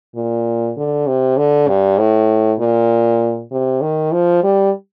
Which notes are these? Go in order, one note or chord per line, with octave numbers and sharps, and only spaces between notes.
A#2
D3
C3
D3
G2
A2
A#2
C3
D#3
F3
G3